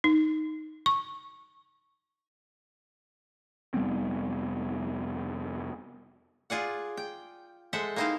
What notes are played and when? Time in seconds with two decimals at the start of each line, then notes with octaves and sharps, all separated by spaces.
0.04 D#4
0.86 C#6
3.74 F1 G3 B3 C4
6.50 F4 G#4 D5 F#5
6.97 G5
7.73 G#3 A4 C5 E5 F#5
7.96 A#3 C4 D#4 E4 C5 F5